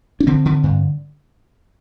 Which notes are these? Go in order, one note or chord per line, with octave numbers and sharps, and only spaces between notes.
D4
D3 C4
D3
G2